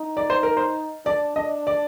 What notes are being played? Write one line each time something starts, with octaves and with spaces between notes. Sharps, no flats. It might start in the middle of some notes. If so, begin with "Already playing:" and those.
Already playing: D#4
D5
C5
A#4
C5
D4 D5
D4 D#5
D5